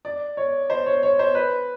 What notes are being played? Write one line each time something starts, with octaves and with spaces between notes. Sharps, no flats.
D5
C#5
C5
C#5
C#5
C5
B4